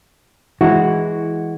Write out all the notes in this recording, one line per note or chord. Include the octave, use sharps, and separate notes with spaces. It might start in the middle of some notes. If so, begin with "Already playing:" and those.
E3 G#3 E4 F#4